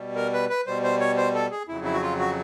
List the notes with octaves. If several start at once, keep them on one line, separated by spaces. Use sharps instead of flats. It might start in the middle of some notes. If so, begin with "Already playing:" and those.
Already playing: B2 G3
A#4
B4
B4
B2 G3 C5
C5
C#5
C5
A4
G#4
F2 C#3 F#3 E4
E4
F#4
F4
F#4